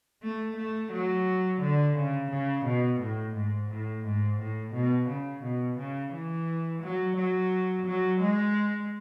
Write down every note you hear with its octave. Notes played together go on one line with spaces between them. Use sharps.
A3
A3
F#3
D3
C#3
C#3
B2
A2
G#2
A2
G#2
A2
B2
C#3
B2
C#3
E3
F#3
F#3
F#3
G#3